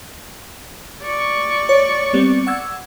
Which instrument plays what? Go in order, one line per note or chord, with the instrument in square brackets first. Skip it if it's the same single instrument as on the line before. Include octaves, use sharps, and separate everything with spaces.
[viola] D5 C#6
[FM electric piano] C#5
G3 B3 C4
F#5 E6 G#6